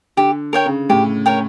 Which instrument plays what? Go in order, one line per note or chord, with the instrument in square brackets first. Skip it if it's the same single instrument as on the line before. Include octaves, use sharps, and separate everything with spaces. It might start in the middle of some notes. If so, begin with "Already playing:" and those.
[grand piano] D3 [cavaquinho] G4
[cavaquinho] A#4 C#5 G5
[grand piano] C#3
[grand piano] A2 [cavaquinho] G4
[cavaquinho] A#4 C#5 G5